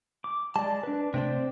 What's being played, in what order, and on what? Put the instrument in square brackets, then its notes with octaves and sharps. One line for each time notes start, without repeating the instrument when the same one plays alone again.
[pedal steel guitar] D6
[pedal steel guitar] G#3 D5 [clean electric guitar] A5
[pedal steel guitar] D4 B4
[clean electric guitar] C3 A3 C4 [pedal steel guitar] C5 D5 G5